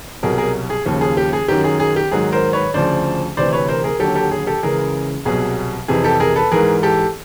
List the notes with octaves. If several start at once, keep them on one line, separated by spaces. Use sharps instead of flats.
C2 B2 F#3 G#4 A#4
G#4 A#4
G#4
D#2 C#3 F3
G#4
G4
G#4
F#2 D#3 F#3 G4
G#4
G#4
G4
G#2 D#3 F#3 G#4
A#4 C5
B4 C#5
D2 C#3 F3 C5 D5
D2 C3 E3 C5 D5
B4 C#5
A#4 C5
G#4 A#4
D#2 D3 F#3 G4 A4
G4 A4
G#4
G4 A4
C#2 C#3 E3 G#4 A#4
C2 B2 F#3 G#4
F2 C3 E3 G#4
G4 A4
G#4 A#4
A4 B4
G#2 E3 G#4 A#4
G4 A4